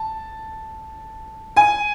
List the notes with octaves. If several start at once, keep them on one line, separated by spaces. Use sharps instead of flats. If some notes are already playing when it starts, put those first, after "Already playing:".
Already playing: A5
G#5